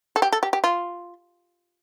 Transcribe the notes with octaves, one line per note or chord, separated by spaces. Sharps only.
A4
G4
A4
G4
G4
F4